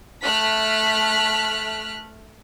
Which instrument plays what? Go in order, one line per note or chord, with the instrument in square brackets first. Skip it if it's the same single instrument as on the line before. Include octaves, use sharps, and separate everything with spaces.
[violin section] A3 F6 F#6 B6